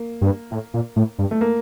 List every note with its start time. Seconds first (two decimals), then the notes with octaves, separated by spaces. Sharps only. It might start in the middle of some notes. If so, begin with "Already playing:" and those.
Already playing: A#3
0.21 G2
0.51 A2
0.74 A#2
0.96 A2
1.19 G2
1.31 A3
1.41 A#3